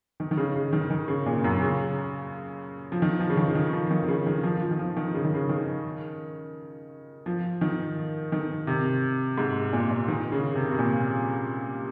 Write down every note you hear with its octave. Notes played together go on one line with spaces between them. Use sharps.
D#3
D#3
C#3
C#3
D#3
D#3
C#3
A#2
F#2
C#3
F3
D#3
F3
C#3
D#3
D#3
F3
D#3
D#3
C#3
D#3
F3
F3
D#3
F3
D#3
C#3
D#3
C#3
D#3
F3
D#3
D#3
C3
G#2
A#2
A#2
D#3
C#3
C3
C3
A#2